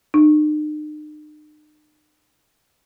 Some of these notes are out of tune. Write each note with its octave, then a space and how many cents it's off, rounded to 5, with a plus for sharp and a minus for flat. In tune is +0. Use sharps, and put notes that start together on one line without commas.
D#4 -45